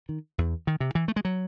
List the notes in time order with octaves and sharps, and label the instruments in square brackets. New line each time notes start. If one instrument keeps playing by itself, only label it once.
[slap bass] D#3
E2
D#3
C3
E3
A3
G#3
F#3